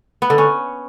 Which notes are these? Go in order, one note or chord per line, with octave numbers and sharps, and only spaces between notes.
B3
D3
C#4